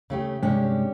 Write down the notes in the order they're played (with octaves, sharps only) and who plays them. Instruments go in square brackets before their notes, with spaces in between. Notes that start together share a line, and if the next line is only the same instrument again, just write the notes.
[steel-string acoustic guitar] C#3 A3 G4
[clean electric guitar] G2 C3 G#3 [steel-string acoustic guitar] C#4 D4 G4